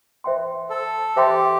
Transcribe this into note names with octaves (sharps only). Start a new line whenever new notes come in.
C5 E5 G5 C6
A4
G4 C5 E5 G5 C6